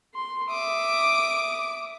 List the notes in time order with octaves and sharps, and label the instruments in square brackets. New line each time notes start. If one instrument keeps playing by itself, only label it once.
[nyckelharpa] C6
[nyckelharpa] E5 D#6 [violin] D6